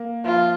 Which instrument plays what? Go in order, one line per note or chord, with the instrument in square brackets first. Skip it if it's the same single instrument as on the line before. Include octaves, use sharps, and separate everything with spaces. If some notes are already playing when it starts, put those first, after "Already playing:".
Already playing: [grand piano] A#3
[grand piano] F3 [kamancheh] F4